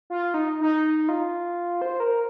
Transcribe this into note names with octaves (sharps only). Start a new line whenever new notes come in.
F4
D#4
D#4
F4
C5
A#4